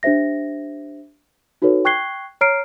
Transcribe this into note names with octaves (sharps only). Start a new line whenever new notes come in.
D4 G4 C5 E5 A#6
D#4 F#4 A4 B4 C#5
G5 C#6 F#6 G#6 C7 G7
C#5 A#5 F6 C7 D7